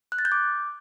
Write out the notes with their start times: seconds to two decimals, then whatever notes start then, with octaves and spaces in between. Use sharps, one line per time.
0.12 F#6
0.19 A6
0.25 G6
0.32 D6